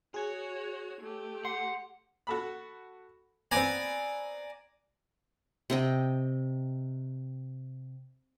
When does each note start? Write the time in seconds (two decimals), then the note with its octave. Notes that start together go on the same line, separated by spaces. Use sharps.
0.14 F#4 G#4 C#5 G#6
1.02 A3 G4
1.45 F#5 C6
2.27 F#4 A4 B5
3.51 B3 C4 D5 G#5 A#5
5.70 C3 D#5 G5